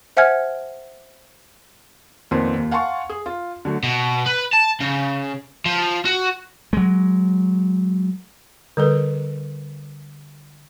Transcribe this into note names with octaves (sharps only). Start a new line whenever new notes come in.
C5 E5 F#5 G#5 F6 G#6
F2 A#2 D#3 B3 C4 C6
D#2
F5 F#5 G#5 A5 C6 C#6
G#4
F4
D3 F#3 A3
B2
B4
A5
C#3
F3
F#4
F#3 G#3
D3 G3 A4 B4